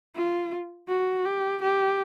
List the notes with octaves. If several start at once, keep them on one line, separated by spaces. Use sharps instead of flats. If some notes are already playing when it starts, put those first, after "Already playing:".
F4
F#4
G4
G4